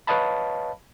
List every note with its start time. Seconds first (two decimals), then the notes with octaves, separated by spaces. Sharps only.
0.07 B4 C#5 D#5 F5 A5 B5